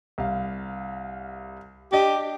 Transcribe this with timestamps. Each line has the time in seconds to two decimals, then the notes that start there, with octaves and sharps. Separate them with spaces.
0.18 C2 F5
1.92 D4 G4 D#5